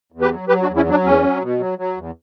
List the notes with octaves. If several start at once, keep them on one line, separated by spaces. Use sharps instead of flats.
E2
G4 B4
F#3
F#3 G4 B4
D4 F#4
E2
C#4 E4
F#3 D4
E2 C#4
F#3
B2
F#3
F#3
E2